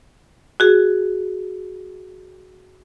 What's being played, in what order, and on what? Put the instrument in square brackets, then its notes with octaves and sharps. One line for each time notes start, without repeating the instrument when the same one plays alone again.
[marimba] F#4 G#4